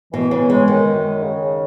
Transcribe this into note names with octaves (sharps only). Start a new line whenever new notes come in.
B2 E3
C#3
C#3 G#3
D#3
F#2
C#3